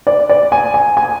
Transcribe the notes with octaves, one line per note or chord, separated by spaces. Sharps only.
D5
D5
G#5
G#5
G#5